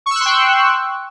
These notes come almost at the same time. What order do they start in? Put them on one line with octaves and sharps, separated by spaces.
C#6 E6 F#6 C6 G5